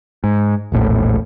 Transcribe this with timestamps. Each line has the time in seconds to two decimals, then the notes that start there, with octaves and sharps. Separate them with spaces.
0.24 G#2
0.72 E1 A#1 A2